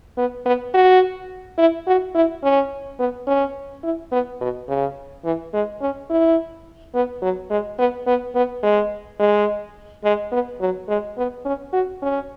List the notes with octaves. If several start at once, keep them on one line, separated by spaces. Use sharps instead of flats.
B3
B3
F#4
E4
F#4
E4
C#4
B3
C#4
E4
B3
B2
C#3
E3
G#3
C#4
E4
B3
F#3
G#3
B3
B3
B3
G#3
G#3
G#3
B3
F#3
G#3
B3
C#4
F#4
C#4